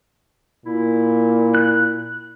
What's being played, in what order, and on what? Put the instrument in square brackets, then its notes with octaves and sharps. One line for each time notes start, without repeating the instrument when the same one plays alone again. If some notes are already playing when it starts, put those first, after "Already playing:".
[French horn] A#2 [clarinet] E4
[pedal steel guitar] F#6